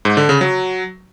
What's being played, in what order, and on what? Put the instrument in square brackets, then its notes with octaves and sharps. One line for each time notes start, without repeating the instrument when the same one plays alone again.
[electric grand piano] G#2
D3
C#3
F#3